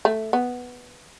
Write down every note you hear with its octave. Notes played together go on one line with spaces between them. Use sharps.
A3
B3